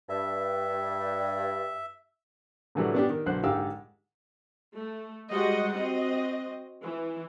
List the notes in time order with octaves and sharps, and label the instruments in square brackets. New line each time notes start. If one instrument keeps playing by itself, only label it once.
[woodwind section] G2 [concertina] E5
[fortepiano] A2 D3 E3 F#3 G3 A3
B3 D4 G4
D#3
B1 D3 C5 F#6
G#2 D3 G4 F5 G5 E6
[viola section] A3
G3 G#3 F#4 C5 D#5 F#5
C4 F#4 D#5
E3